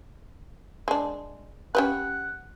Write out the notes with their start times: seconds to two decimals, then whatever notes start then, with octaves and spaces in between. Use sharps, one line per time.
0.88 G#3 D4
1.75 C#4 G4 B4 F#5